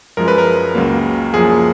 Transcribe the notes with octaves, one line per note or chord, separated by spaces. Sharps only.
F#2 F3 G#3 A#4
B4
A#4
C#2 C#3 F#3 A#3
F#2 F3 A#3 G#4